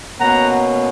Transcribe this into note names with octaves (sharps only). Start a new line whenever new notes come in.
B2 A#3 C#4 F#5 A#5